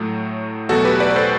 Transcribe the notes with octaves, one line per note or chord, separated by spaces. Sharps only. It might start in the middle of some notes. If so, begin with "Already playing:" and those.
Already playing: A2 F#3 A3
E2 B2 F#3 A3 F#4 A4
G4 B4
B4 D5
D5
A4 C5